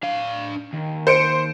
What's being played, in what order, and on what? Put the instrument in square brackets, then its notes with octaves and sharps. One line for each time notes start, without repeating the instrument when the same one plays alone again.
[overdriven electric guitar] D4 F5
D#2
[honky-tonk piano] C5 C#7 D7